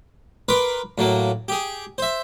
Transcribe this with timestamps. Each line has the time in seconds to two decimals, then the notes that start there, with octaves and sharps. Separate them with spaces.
0.49 A#4 B4 C6 D6
0.98 A2 F#3 A#3
1.48 G4 G#4
1.98 C5 E5